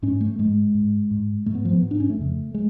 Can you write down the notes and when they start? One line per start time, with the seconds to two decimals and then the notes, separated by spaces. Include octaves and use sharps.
0.02 G#2 C#4
0.21 A3
0.39 G#2 G#3
0.74 G#2
1.11 G#2
1.46 G#2 A3
1.55 B3
1.65 F3
1.73 B3
1.82 G#2
1.91 D4
2.00 C#4
2.10 A3
2.18 F2 C#3
2.54 G#3